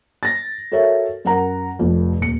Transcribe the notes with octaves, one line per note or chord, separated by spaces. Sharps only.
A6 A#6
F#4 A4 A#4 C#5 E5
F#2 A#4 F#5 A#5
F1 F2
D#1 C#7